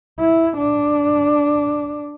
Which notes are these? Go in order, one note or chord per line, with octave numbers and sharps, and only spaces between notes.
E4
D4